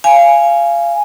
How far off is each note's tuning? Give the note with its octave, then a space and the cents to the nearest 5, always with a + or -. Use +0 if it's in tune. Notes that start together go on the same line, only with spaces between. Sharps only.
F5 -20 G#5 +0